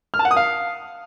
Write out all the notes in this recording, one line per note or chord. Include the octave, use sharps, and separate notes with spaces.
F6
A5
F#5
D#6
F5